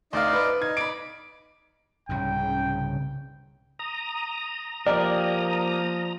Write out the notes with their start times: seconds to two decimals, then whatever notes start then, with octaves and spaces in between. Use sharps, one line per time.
0.13 D2 D#4 C5 D5 D#5 F5
0.33 B4
0.62 D#4 G#6
0.77 D5 B5 D7
2.09 C2 G#2 C#3 G5
3.79 A#5 D#6
4.87 F3 A#3 G4 A#4 D5